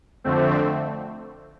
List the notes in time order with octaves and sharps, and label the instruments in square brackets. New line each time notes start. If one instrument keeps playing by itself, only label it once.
[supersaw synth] F2 D3 A3 C4